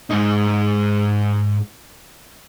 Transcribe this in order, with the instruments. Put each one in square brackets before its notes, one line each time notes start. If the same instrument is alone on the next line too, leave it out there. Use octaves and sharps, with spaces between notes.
[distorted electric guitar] G#2 D#4